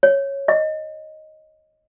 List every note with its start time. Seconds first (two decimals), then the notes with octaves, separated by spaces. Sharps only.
0.03 C#5
0.48 D#5